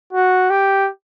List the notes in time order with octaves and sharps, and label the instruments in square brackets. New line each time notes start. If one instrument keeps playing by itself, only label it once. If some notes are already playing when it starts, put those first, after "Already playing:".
[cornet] F#4
G4